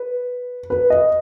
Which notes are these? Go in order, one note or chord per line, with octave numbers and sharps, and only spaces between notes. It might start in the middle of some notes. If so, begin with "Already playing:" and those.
Already playing: B4
B4
D#5